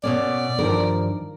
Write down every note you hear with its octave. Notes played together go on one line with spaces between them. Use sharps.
B2 A#3 C#4 D5
G2 D#3 F3 A#4